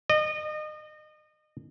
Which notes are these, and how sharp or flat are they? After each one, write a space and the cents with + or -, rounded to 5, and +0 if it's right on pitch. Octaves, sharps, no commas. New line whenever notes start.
D#5 -30